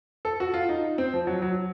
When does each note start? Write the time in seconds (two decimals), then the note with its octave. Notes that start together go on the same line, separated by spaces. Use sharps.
0.25 A4
0.40 F#4
0.54 F4
0.69 D#4
0.98 C4
1.13 F3
1.27 F#3
1.42 F#3